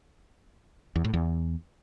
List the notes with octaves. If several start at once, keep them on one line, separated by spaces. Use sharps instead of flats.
E2
A2
E2